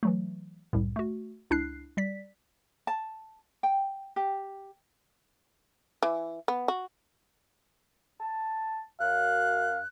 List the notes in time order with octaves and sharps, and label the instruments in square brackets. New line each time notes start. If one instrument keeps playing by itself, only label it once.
[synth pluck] E3 F#3 A3
C2 F#2 A2
A3 F#4
C#2 D4 E4 F#6 C7
G3 D5 B6
[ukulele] A5
G5
G4
[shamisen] E3
B3
F#4
[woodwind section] A5
[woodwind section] F#2 [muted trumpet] F5 [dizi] F#6